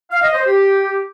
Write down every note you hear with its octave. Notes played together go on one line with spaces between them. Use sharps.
F5
D#5
C5
G4